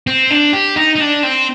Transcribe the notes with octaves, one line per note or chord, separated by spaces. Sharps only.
C4
D4
G4
D#4
D#4
D4
C4